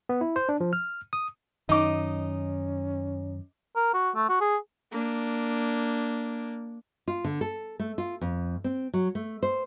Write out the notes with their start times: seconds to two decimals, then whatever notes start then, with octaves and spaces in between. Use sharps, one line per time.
0.09 B3
0.21 E4
0.36 C5
0.49 D4
0.60 F3
0.73 F6
1.13 D#6
1.69 F#2 D#3 C#4 D#4 D#5 D6
3.76 A#4
3.94 F#4
4.16 A3
4.29 F#4
4.41 G#4
4.91 A#3 D4
7.08 F4
7.24 D3
7.41 A4
7.79 A3
7.98 F4
8.21 F2
8.64 C4
8.93 F#3
9.15 A3
9.43 C5